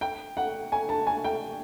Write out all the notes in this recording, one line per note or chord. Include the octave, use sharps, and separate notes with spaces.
G5
F#5
G#5
A5
G#5
G5